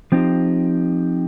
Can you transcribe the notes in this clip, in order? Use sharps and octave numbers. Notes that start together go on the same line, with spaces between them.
F3 C4 D#4 G4